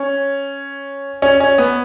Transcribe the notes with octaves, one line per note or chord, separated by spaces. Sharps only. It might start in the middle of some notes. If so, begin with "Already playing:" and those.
Already playing: C#4
C#4
C#4
B3